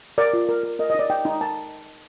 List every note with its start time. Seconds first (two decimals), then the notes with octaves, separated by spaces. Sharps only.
0.18 A#4 D5
0.33 F4
0.49 A#4
0.63 A#4
0.79 A#4 D#5
0.90 D#5
0.95 D#4 D5
1.10 D#4 G5
1.25 D#4
1.41 A#4 A5